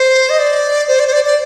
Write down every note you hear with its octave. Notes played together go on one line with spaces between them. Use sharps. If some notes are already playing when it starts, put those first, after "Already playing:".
Already playing: C5
D#5
D5
C5
D5
C5
D5
D5